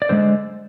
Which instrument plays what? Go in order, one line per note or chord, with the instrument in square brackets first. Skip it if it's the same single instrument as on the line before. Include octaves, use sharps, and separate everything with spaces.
[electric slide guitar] D5
D3 F3 G#3 C5